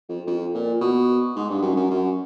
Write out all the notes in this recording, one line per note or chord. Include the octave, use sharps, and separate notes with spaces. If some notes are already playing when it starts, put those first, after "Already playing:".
F2
F2
A#2
B2
G#2
G2
F#2
F#2
F#2